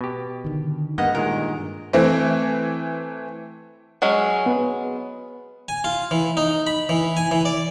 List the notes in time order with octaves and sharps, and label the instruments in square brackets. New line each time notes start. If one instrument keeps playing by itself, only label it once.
[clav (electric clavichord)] B2 G4
[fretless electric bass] D3 D#3
[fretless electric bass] G2 [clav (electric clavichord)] A#3 B3 [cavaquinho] D#5 F#5
[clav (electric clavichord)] A#2 D#3 G#3 [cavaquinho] A#4
[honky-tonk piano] E3 A3 C4
[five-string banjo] F#3 G#3 C#4
[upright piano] B3
[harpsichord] G#5
F4
E3
D#4
B5
E3
G#5
E3
D5